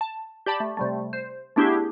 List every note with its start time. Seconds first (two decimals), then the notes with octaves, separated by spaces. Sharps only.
0.01 A5
0.46 G4 D5 A5 B5
0.60 A3
0.77 C3 G3 A3
1.13 C5
1.56 A3 B3 D4 E4 G4 G#4